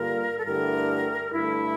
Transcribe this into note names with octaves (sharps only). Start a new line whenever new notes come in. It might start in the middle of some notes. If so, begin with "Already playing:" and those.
Already playing: G2 D3 G3 A#3 F4 A#4
A4
G2 D3 A3 E4 G4 A#4
G2 D3 A3 E4